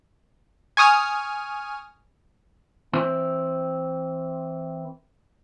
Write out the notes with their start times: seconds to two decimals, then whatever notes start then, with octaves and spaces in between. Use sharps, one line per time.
0.77 G#5 C#6 D#6 F6
2.93 E3 C4